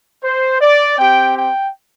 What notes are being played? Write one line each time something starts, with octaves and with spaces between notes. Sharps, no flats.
C5
D5
C4 G4 G5
G5